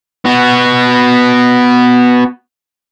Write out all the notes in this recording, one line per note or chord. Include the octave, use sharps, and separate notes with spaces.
B3 F#4